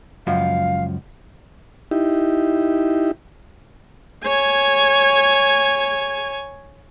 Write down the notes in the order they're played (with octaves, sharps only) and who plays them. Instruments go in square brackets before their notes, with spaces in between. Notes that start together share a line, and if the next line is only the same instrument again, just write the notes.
[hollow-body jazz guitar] C#2 F#2 F3 [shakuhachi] F5
[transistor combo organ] D#4 E4 G4
[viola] C#5 G#5